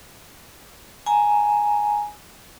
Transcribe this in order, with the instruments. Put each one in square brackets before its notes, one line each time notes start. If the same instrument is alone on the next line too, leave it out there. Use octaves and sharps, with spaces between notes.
[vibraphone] G#5 A#5